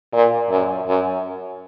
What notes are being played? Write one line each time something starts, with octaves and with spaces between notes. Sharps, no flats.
A#2
F#2
F#2